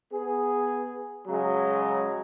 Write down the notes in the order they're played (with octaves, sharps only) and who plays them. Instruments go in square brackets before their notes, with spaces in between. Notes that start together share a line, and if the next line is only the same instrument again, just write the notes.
[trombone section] B3 G#4
C#3 F#3 G#3